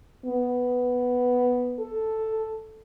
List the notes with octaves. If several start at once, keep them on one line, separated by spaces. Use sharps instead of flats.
B3
A4